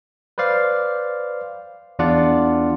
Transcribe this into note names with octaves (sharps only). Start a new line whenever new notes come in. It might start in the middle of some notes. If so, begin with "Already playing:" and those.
B4 C5 D5 F5
E2 D4 F4 D5 F#5